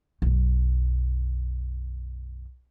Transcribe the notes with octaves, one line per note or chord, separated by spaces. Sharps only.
B1 F#2